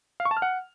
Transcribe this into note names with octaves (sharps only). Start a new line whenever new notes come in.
F5
C#6
A5
F6
F#5